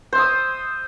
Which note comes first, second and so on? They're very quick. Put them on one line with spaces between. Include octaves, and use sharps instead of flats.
C5 E5 D#6